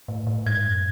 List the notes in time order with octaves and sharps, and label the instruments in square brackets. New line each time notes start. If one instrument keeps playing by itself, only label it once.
[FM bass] A2
A2
[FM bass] G#2 [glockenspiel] G#6
[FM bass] F#2